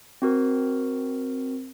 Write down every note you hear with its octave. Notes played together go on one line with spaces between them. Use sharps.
C4 F#4 A#4